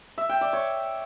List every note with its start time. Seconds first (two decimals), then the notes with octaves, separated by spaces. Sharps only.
0.18 E5
0.29 G5
0.41 D5
0.53 C#5